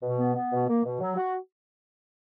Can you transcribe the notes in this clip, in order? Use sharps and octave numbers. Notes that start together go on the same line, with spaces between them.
B2
B3
B3
B2
A#3
B2
F#3
F#4